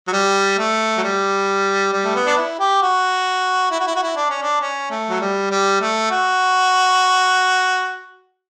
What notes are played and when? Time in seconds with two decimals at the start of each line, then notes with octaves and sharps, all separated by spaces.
0.08 F#3
0.13 G3
0.58 A3
0.97 F#3
1.03 G3
1.93 G3
2.04 A3
2.15 B3
2.26 D4
2.37 E4
2.59 G4
2.82 F#4
3.71 E4
3.79 F#4
3.87 E4
3.96 F#4
4.03 E4
4.16 D4
4.29 C#4
4.42 D4
4.61 C#4
4.91 A3
5.10 F#3
5.21 G3
5.50 G3
5.81 A3
6.11 F#4